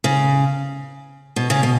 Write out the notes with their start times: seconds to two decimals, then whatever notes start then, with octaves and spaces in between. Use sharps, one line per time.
0.04 C#3
1.36 B2
1.50 C#3
1.63 B2